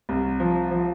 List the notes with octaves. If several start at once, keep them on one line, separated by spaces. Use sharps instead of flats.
C2
F3
F3